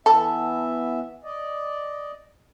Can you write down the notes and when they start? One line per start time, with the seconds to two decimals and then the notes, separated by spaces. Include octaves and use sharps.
0.06 E3 B3 A4 E5
1.24 D5 D#5